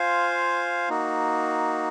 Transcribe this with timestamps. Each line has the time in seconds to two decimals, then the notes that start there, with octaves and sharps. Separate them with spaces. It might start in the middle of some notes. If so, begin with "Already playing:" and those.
Already playing: F4 C5 F5 G#5
0.89 A#3 D#4 F#4